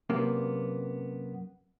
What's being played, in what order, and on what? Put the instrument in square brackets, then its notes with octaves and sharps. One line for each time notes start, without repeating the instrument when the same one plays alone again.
[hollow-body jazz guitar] F#2 C3 A#3 B3